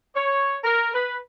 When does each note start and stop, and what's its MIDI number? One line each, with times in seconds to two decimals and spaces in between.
0.16 0.57 73
0.64 0.90 70
0.94 1.17 71